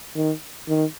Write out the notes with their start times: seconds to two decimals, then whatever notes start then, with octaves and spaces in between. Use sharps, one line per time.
0.15 D#3
0.69 D#3